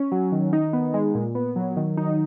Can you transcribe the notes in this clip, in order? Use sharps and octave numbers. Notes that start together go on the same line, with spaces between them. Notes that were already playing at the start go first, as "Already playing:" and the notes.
Already playing: C#4
F#3
D#3
D#4
B3
G#3
A#2
B3
F#3
D#3
D#4